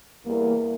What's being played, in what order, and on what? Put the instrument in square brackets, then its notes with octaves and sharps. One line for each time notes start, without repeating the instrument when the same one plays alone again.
[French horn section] E2 E3 G3 A#3